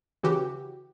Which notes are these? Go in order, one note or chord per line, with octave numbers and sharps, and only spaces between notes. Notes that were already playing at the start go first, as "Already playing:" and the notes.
C#3 E3 F#4 G4